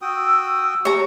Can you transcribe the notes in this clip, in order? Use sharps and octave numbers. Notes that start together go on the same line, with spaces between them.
F#4 G5 D#6 E6
G4 C#5 A#5